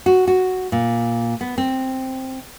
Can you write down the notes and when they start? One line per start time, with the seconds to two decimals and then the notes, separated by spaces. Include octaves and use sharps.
0.06 F#4
0.28 F#4
0.72 A#2
1.41 B3
1.58 C4